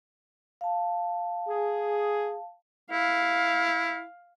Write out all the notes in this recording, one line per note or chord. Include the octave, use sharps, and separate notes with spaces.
F5 A5
G#4
E4 F5